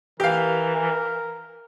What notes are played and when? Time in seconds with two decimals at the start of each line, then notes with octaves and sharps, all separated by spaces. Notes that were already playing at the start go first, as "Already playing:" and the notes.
0.20 E3 G4 A#4 F5